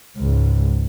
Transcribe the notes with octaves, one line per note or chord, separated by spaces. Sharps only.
C#2 G#2